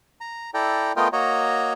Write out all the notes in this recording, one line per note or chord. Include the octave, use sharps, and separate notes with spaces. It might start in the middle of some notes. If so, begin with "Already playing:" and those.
A#5
E4 A4 D5 G5 A#5
A3 B3 F4 A#4 D#5 G5
A#3 F#4 C#5 D#5 A#5